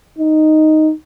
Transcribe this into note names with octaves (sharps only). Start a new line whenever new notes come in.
D#4